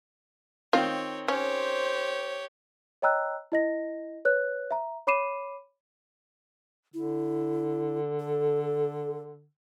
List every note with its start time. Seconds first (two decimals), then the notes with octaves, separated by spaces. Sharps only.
0.73 D#3 C4 F4 C#5
1.28 C#4 G4 C5 C#5
3.02 C#5 D#5 G5 A#5 E6 F#6
3.52 E4 D#5 A#6
4.25 B4 C#5 F#6
4.71 E5 A#5
5.07 C#5 B5 D6 C7 D#7 E7
6.94 D3 E4
8.20 A4